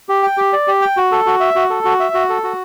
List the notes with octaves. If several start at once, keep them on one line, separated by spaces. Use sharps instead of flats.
G4
G5
G4
D5
G4
G5
F#4
A4
F#4
E5
F#4
A4
F#4
E5
F#4
A4
F#4